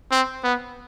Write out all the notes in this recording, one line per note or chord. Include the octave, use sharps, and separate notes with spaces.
C4
B3